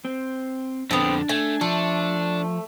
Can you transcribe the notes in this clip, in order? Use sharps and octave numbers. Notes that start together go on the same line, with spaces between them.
C4
F2 D3 B3 C4 D4
A3 G#5
F3 A3 D4